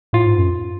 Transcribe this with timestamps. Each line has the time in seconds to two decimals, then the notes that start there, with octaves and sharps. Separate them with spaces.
0.13 A2 F4
0.26 G#2
0.38 F#2